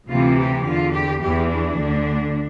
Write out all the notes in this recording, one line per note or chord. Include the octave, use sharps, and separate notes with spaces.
D2 C3 E3 F4
G4
E2 D3 F4
G4
E2 E3 G4
D4
D2 D3